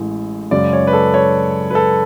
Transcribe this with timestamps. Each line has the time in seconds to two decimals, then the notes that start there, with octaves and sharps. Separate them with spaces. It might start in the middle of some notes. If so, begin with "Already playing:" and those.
Already playing: A1 A2 E3 G#3
0.51 F#2 C#3 G#3 D5
0.73 C#5
0.87 B4
0.93 A4
1.14 C#5
1.70 B4
1.75 A4